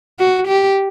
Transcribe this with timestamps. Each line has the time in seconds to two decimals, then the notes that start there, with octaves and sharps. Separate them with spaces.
0.19 F#4
0.48 G4